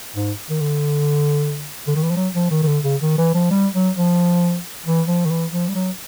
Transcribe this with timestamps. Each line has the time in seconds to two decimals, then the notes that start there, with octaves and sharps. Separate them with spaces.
0.16 G#2
0.50 D#3
0.60 D3
1.88 D3
1.96 D#3
2.03 E3
2.10 F3
2.17 F#3
2.34 F3
2.50 D#3
2.63 D#3
2.67 D3
2.84 C#3
3.02 D#3
3.18 E3
3.34 F3
3.51 G3
3.74 F#3
3.96 F3
4.86 E3
5.08 F3
5.26 D#3
5.31 E3
5.52 F3
5.68 G3
5.75 F#3